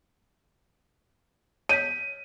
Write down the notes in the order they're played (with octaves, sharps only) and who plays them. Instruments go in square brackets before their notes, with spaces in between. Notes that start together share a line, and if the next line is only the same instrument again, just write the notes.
[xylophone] C#5 G6 B6 [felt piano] D#7